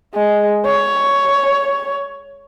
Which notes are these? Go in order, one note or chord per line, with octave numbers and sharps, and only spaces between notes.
G#3
C#5